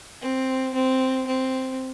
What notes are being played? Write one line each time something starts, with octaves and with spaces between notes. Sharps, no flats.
C4
C4
C4